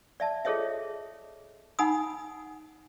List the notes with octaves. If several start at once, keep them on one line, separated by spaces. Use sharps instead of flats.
D5 E5 A5
F4 G#4 A4 C#5 D#5 E5
D#4 F#5 G#5 B5 D#6